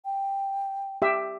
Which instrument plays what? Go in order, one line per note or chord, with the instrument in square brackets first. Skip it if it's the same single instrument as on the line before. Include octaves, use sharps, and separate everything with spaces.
[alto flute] G5
[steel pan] G4 E5